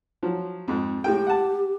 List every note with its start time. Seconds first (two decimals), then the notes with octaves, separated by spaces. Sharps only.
0.23 F3 F#3
0.68 F2 G#2
1.04 A2 G#3 G4 G5
1.27 F#5 A5